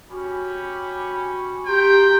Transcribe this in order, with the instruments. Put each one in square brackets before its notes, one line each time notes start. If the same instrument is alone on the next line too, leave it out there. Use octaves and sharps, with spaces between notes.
[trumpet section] C#4 G4 B5 [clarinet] F#4
[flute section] G4 A#5 C6 [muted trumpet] G5